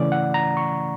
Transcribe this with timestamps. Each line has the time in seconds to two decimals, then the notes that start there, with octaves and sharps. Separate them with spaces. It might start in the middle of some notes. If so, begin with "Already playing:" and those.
Already playing: C#3 E3 A3 C#4 D5
0.12 F#5
0.34 A#5
0.57 C#6